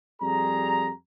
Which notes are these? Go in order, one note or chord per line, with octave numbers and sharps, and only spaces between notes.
F2 G3 G#4 A#5